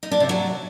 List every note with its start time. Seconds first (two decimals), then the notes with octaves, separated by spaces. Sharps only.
0.03 D#4
0.11 D4
0.20 C3
0.29 F#3